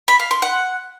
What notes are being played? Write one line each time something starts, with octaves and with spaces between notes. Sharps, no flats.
B5
F5
C6
F#5